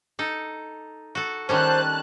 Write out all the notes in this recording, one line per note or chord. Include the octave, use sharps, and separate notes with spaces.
D#4 A4
F#4 A4
D#3 G3 C#4 C5 A5 F#6